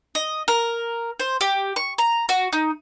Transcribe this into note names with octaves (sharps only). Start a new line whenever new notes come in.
D#5
A#4
C5
G4
C#6
A#5
F#4
D#4